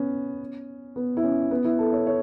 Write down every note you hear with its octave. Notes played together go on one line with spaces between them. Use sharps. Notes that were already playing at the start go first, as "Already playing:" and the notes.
Already playing: B3 C#4
B3
E4
C#4
B3
E4
A4
C#5
C#5